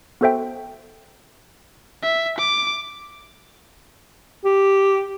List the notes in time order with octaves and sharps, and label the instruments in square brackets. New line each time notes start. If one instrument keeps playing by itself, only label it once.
[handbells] B3 F#4 A4 C5 E5 G5
[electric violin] E5
D6
[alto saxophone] G4